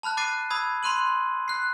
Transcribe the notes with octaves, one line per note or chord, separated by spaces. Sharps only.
A5 B5 F6 F#6
D6 F#6 A6 C7 D#7
B5 D#6 E6 G#6
B5 C6 F#6 D#7 F#7
F#6 C7